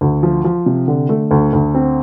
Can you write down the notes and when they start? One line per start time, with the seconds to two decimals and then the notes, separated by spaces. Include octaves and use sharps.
0.01 D2
0.23 F3
0.44 F3
0.66 C3
0.88 D3
1.09 A3
1.31 D2
1.53 D2
1.74 C4